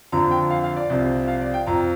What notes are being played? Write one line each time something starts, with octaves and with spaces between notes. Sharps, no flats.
F2 D3 F3 A#5
G5
F5
F5
D5
C2 C3 F3
F5
D5
G5
F2 F3 A#5